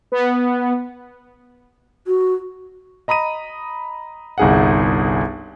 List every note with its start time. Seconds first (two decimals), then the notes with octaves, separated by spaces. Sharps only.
0.12 B3
2.07 F#4
3.08 D#5 A#5 B5 D#6 D#7
4.38 G1 C2 D#4 G#4 F5 F#5